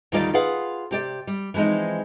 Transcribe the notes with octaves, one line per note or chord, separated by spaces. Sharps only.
D2 D#3 G3 F4 A#4 D5
F4 G#4 B4 F5 F#5
C3 G4 D5
G3
E3 F3 G#3 C4 D#4